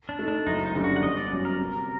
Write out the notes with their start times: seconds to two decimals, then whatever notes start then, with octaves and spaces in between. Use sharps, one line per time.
0.09 D4
0.19 A3 D#4
0.28 D4
0.46 F#1 D#4
0.66 D#4
0.74 F#2 D3 G3 D4
0.84 F#4
0.96 F#5
1.03 G1 D#5
1.17 D5
1.31 F#2 F#3
1.45 A#4
1.59 C3